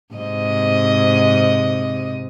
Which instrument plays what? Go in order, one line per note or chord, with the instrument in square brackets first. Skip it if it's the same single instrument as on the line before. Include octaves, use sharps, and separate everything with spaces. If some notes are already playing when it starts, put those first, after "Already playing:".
[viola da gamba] G#2 C3 D#5